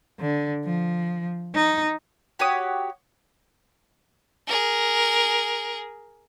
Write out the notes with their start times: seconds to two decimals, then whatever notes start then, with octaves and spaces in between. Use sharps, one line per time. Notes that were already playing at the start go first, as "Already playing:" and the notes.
0.20 D3
0.65 F3
1.55 D#4
2.39 F#4 G4 C#5 D#6
4.47 G#4 A#4